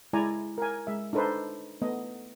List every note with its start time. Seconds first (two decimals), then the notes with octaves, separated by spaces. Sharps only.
0.13 G#3 E4 D5 G#5 A#5
0.58 A#4 G#5
0.87 G#3 E5
1.13 D4 D#4 A4 B4 C5
1.82 A3 B3 D#5